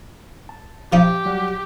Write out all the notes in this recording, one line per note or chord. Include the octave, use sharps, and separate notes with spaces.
A5
F3 D#4 E4 G4
F#3 G3 F#5